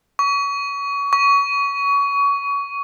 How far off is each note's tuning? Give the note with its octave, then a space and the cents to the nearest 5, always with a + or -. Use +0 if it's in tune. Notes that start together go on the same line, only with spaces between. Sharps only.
C#6 +30
C#6 +25